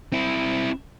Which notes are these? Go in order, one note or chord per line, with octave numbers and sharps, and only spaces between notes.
C4 E4